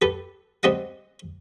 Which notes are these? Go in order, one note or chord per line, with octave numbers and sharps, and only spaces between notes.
G4 A4 B4
G3 C4 G4 D#5 F#5